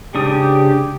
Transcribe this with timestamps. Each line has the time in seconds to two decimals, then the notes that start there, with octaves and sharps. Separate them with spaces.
0.15 G#2 C#3 D4 G4 D#6